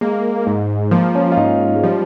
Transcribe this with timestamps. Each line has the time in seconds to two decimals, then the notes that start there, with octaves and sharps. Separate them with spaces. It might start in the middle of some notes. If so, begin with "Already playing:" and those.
0.01 G#3 A#3
0.47 G#2
0.91 F3 A#3
1.15 C#4
1.32 F4
1.37 G#2 D#4
1.76 G#3
1.83 F3 G3